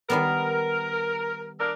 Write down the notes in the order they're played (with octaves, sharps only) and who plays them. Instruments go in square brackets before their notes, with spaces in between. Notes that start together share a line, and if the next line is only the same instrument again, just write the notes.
[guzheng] D#3 G3 B3 [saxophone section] A#4
[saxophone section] D4 A4 A#4